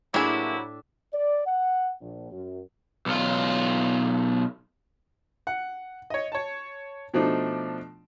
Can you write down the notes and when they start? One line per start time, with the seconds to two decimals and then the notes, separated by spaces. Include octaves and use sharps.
0.14 A2 C3 F#3 A#3 D4 E4 G#4 E5
1.13 D5
1.46 F#5
2.01 A#1
2.32 F#2
3.06 B1 F4
5.47 F#5
6.10 C#5 D#5
6.32 C#5 A5
7.14 B2 F3 A3 D4 D#4